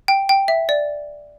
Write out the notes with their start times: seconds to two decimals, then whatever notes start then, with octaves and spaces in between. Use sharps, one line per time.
0.08 G5
0.29 G5
0.48 E5
0.69 D5